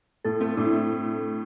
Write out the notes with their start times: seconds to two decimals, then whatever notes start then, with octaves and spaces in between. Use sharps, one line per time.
0.24 A2 A4
0.40 A3 C4
0.57 A2 D4
0.65 E4